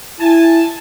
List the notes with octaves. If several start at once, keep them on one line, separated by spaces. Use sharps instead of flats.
E4 G#5 A5